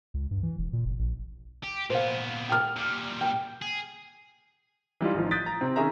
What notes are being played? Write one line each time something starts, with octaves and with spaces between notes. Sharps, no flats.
C#2
G2
E3
E1
A#2
F1
A#1
G4
A#2 B3 C5 F5
G5 F6
A#2 G3
G5
G#4
E3 G3 D#4 F4
A1 D#3 F3
D#6 F#6 G6 A6 B6 D7
A#5
C3 C4
D#3 C#4 G#4 E5 A#5